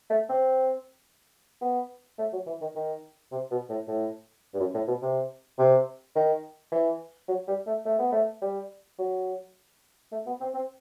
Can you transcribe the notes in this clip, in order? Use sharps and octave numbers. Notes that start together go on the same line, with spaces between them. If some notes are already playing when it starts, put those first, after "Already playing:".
A3
C4
B3
A3
F#3
E3
D#3
D#3
C3
B2
A2
A2
G2
F#2
A2
B2
C3
C3
D#3
E3
F#3
G3
A3
A3
B3
A3
G3
F#3
A3
B3
C4
C4